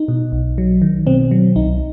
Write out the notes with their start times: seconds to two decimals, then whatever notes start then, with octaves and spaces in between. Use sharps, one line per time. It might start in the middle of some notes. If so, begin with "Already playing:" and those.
Already playing: D#4
0.08 B2
0.32 B1
0.58 F#3
0.82 D#3
1.07 B2 C4
1.31 F#3
1.56 C2 D#4